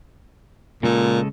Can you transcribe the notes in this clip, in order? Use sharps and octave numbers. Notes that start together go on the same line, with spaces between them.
A#2 C#3 G#3 A4